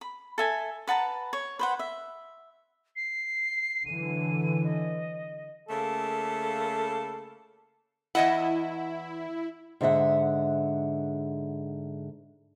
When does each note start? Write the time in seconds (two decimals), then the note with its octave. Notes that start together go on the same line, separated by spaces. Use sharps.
0.01 B5
0.38 A4 E5 G#5
0.87 B4 F#5 A5 A#5
1.33 C#5
1.59 B4 C5 F#5
1.79 E5
2.96 C7
3.86 D3 E3 F#3 D#7
4.64 D#5
5.69 C#3 A3 A#3 A4
8.15 E2 E4 D#5 F#5
9.81 G#2 D3 G#4 E5 F#5